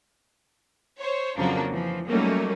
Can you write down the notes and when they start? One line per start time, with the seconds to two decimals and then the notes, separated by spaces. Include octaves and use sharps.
0.99 C5 C#5
1.37 F2 C#3 F3 F#3 A#3 D4
1.71 E3 F3
2.09 F#3 G3 A3 A#3 C#4 D#4